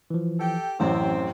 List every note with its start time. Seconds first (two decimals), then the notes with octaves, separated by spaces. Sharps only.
0.10 E3 F3
0.40 G4 A4 G5
0.80 A1 F#2 A2 C3 E3 C4